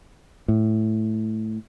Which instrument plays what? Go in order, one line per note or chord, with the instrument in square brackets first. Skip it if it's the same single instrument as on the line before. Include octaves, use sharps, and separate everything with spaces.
[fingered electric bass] A2